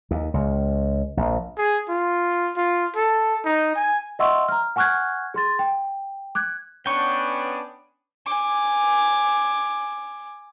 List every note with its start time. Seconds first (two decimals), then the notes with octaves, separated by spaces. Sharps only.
0.11 D#2
0.34 C#2
1.17 A#1
1.58 G#4
1.89 F4
2.57 F4
2.96 A4
3.45 D#4
3.75 G#5
4.19 D#5 E5 F#5 C6 C#6 E6
4.48 A#5 F6
4.76 F#5 G#5 C#6 F6 F#6 G#6
5.34 G#4 C6 A6
5.59 G5
6.35 D6 F#6 G#6
6.86 B3 C#4 D4 G5 C#6
8.26 G#5 D6